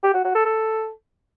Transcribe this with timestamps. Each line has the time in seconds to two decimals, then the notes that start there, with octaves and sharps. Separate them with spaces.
0.03 G4
0.14 F#4
0.24 F#4
0.35 A4
0.45 A4